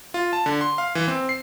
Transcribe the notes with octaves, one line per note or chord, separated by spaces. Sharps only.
F4
A5
D3
C6
F5
E3
C4
C7